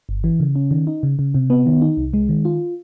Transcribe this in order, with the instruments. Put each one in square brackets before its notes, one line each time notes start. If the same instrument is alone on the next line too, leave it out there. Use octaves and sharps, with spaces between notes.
[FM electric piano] G1
E3
C#3
C#4
D#3
D#4
C#3
C#3
C3
B3
D#3
D#4
C2
G#3
D#3
F4